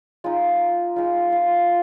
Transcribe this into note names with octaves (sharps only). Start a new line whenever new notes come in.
G#3 D#4 F4
G#3 D#4 F4
F4